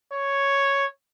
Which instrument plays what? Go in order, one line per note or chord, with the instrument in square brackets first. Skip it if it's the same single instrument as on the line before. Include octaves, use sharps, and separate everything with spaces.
[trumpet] C#5